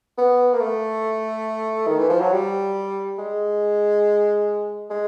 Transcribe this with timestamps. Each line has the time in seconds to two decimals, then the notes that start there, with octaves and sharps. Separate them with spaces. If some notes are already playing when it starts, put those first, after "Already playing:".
0.18 B3
0.54 A#3
0.61 A3
1.87 D#3
1.99 E3
2.10 F3
2.21 F#3
2.33 G3
3.19 G#3
4.90 G#3